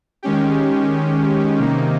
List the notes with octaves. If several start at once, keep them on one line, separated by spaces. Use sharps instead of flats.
D#3 G#3 C#4 G4
C3 D#3 A#3 D#4